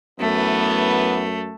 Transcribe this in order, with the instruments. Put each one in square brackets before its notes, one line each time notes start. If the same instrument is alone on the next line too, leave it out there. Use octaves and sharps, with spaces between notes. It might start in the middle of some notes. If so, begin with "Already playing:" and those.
[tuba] F#2 [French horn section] E3 B3 [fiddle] A3